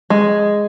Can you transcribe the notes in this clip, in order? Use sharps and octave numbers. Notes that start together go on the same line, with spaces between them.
G#3